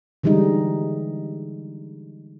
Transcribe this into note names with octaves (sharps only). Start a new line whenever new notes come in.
D3 E3 G3 G#3 D#4